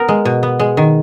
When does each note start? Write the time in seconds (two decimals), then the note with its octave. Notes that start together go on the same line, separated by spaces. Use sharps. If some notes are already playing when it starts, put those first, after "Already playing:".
Already playing: B3 A#4
0.08 G#3
0.25 B2
0.43 B3
0.59 G#3
0.77 D#3